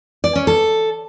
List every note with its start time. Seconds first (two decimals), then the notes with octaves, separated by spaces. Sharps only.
0.24 D5
0.35 C#4
0.47 A4